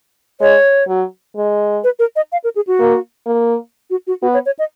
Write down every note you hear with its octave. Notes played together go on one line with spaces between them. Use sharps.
G#3 C#5
F#3
G#3
B4
A#4
D#5
F5
A#4
G#4
F#4
A#3
A#3
F#4
F#4
B3 F#4
C#5
C#5
D#5